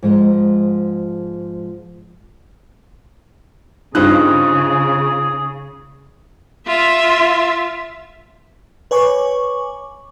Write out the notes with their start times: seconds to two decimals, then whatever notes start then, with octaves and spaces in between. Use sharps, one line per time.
0.03 G#2 F3 G#3
3.95 G2 C#3 D#4 F4 G#4 C5 F#6
6.67 F4 E5
8.91 B4 C#5 G#5 C#6 D6